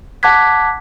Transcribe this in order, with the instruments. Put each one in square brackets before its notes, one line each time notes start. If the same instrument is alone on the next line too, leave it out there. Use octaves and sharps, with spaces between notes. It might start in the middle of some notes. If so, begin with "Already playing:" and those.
[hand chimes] F#5 A5 D6 F#6 G#6 B6